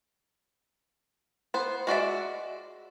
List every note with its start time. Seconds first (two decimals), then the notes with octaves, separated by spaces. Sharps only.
1.54 B3 C5
1.87 G#3 F#4 D5 E5